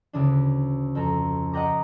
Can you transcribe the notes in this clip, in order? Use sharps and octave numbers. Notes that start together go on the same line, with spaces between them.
D2 C#3 E3 D4
F2 A4 A#5
G4 D#5 F#5 G5 A#5 D6